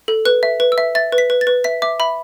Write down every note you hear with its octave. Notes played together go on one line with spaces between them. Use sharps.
A4
B4 F#6
E5
B4
E6
E5
E5 A6
B4
B6
B4
A6
B4
E5 B6
E5 D6
E5 B5